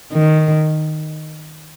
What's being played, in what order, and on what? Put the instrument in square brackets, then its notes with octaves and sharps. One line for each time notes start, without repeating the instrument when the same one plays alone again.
[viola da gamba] D#3